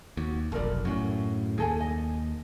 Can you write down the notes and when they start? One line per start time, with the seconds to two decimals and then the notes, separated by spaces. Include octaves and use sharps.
0.17 D#2 F#4
0.52 F1 B1 A4 A#4 D5
0.85 F#2 A2 C#4 F#4
1.58 D#2 G#4 A4 G#5
1.80 D#5